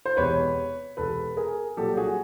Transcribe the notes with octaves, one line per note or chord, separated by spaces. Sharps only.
C5
E1 E2 C3 B4 C#5
E1 E2 C3 A4 B4
G#4 A#4
C2 A#2 F#3 G4 A4
F#4 G#4